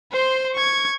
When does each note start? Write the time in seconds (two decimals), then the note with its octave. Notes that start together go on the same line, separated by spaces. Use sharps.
0.12 C5 C6
0.55 C#6 G#6